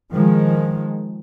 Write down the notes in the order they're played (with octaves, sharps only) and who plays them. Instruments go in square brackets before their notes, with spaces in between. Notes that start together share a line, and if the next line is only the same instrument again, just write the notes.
[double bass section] D#3 F3 G#3